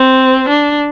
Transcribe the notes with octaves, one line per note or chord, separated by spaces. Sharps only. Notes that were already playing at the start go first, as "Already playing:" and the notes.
Already playing: C4
D4